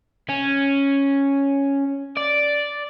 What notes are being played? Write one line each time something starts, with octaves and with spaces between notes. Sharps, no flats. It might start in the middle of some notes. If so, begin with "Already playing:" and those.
C#4
D5